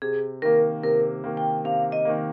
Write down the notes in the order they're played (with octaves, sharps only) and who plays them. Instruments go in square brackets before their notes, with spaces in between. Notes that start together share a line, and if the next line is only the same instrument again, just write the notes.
[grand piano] C3 [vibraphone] G#4
[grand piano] D#3 A#3 [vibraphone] A#4
[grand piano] C3 [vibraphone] A#4
[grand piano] D#3 A#3
[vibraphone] G5
[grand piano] C3 [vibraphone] F5
[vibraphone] D#5
[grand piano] D#3 A#3